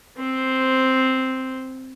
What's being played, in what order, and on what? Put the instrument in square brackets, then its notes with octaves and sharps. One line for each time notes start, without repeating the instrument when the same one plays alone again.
[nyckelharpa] C4 C5